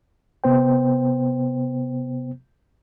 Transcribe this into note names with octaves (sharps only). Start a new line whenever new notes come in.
C3 B3 C5 G5